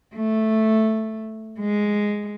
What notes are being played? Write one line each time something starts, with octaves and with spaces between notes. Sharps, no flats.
A3
G#3